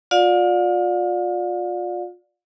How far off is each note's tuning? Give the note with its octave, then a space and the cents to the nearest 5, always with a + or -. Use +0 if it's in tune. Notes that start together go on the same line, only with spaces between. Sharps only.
F4 +30 D5 +0 F5 +40